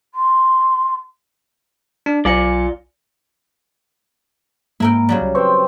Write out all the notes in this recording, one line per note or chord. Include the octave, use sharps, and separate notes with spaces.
C6
D4
B1 F4 D5 G#5 C#7
G#2 A#3 E4 A#4 G5
C#3 F#3 G3
C2
C4 B4 G5 C#6